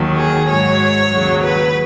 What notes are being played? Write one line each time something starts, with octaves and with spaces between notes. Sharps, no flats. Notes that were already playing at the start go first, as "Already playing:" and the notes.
Already playing: D#2 D#3 F#3
G#4
G#2 F#3 C#5
D#2 C#3 F#3
B4